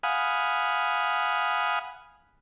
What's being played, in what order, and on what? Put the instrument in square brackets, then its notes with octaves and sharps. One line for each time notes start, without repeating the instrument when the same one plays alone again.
[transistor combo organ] F5 F#5 G#5 B5 D#6